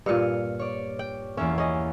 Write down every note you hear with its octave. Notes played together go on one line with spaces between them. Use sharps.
G2 A#2 F6 C#7 D#7
C#5 D5
G5
E2 A#3 C#4 E5
C#4 D#5